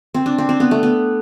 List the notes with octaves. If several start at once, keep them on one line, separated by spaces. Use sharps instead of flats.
C4
D4
C4
C4
B3
A3
B3